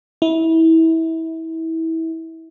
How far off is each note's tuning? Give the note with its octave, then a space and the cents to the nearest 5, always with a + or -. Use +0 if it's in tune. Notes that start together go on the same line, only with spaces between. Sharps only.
E4 -25